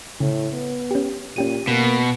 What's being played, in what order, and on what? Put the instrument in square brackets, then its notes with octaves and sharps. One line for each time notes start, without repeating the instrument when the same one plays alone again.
[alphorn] A2 [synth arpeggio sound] C#3
[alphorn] B3
[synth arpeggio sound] C#4 G4
[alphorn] A#2 [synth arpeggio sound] C#4 G4 D#7
[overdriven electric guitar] B2 [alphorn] A#3